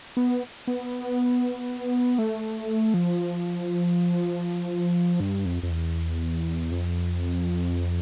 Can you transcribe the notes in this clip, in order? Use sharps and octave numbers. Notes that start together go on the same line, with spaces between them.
B3
B3
A3
F3
G2
F2
F2
E2
F2